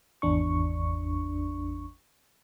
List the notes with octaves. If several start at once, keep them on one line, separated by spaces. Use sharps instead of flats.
G#1 E2 D4 C#6